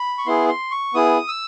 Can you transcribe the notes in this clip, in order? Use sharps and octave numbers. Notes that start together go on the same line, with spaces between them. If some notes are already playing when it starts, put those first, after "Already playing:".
Already playing: B5
C#6
B3 E4 G#4 C6
C6
C#6
B3 E4 G#4 D#6
E6